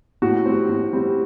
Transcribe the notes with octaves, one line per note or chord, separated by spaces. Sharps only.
A2 F#4
G3 C4
A2
G3 C4